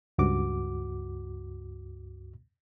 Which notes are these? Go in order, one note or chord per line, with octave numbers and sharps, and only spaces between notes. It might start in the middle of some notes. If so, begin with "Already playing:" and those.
C#2 G2 F#4 D6